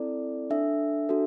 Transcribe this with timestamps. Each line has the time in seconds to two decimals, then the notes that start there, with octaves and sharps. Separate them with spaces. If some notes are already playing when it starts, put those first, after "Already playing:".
Already playing: C4 E4 A4 D5
0.50 D4 A4 E5
1.09 D4 F#4 A4